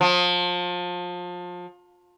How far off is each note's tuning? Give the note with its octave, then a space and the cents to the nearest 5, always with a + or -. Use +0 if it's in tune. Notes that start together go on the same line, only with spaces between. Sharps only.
F3 +30